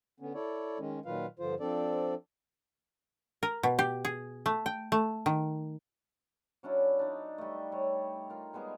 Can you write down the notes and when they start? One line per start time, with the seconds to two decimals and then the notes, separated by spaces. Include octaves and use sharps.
0.20 D3 B3 C#4
0.34 E4 A4 C#5 D5
0.79 D#3 G#3 C#4
1.05 A#2 D#3 F#3 F4 B4 F5
1.39 G2 D3 F3 F4 C5
1.60 F3 C4 D4 A4 D5
3.43 A#4
3.63 B2
3.79 G4
4.05 G#4
4.46 A3
4.66 G5
4.92 A3
5.26 D#3
6.63 F#3 C#4 D4 E4
6.99 D4 D#4
7.38 G3 A3
7.72 G3 C#5
8.30 F4 A#4
8.53 G3 G#3 B3 G#4